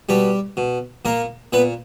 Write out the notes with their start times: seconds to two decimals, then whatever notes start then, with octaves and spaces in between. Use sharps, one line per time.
0.09 B2 G3 G4
0.57 B2
1.05 A#2 A#3 A#4
1.53 A#2 B3 B4